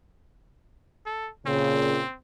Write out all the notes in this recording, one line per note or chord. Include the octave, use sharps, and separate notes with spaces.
A4
A#2 C#3 C4